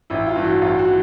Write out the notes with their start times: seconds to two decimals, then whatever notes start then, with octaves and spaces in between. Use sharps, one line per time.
0.10 A1 E4
0.27 F4
0.36 G2 E3
0.44 F#4
0.62 A1 F4
0.79 F#4
0.87 E3